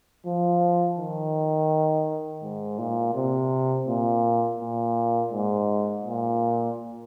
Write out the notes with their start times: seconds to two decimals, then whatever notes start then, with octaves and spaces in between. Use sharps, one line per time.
0.26 F3
0.98 D#3
2.43 G#2
2.78 A#2
3.14 C3
3.87 A#2
4.59 A#2
5.32 G#2
6.05 A#2